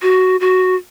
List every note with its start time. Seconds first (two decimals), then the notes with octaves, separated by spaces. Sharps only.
0.02 F#4
0.40 F#4